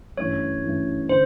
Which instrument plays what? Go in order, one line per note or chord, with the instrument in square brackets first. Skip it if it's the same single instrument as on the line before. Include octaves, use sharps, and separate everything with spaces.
[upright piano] G2 E3 A3 C#4 [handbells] C#5
[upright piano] G2 E3 A3 C#4
[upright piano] D3 [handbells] C5